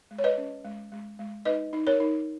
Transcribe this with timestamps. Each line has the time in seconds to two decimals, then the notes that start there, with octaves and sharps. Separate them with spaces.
0.11 G#3
0.18 C#5
0.24 B4 D#5
0.37 C#4
0.64 G#3
0.92 G#3
1.19 G#3
1.45 D#4 B4 D#5
1.73 D#4
1.87 A#4 C#5
2.00 D#4